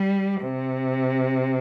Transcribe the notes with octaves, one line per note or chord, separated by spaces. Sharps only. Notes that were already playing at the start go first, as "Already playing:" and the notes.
Already playing: G3
C3